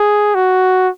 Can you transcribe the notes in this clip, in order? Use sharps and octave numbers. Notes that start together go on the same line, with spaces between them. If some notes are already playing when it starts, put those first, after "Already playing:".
Already playing: G#4
F#4